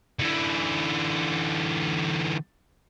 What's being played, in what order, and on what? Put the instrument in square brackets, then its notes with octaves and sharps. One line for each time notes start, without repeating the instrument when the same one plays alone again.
[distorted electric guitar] D3 E3